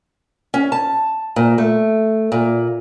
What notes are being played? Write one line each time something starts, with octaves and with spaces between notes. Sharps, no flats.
C#4
A5
A#2
A3
A#2